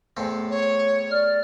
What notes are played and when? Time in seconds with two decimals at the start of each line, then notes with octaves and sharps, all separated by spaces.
0.17 E2 A2 C4
0.51 C#5
1.11 D5 F6